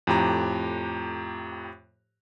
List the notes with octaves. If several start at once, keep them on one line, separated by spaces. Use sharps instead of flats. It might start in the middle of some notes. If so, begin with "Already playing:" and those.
F2 A2 G4 A#5